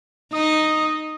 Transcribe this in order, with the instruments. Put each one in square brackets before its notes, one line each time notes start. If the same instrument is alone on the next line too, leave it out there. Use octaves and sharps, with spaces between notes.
[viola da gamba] D#4 [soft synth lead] D#6